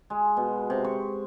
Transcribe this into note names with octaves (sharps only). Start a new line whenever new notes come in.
G#3
B2
C3
C#6